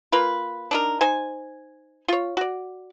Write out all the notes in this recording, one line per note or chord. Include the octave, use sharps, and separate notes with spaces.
A#3 F4 B4
D4 D#4 A#4
D#4 C5 G#5
F4 C#5
F#4 D5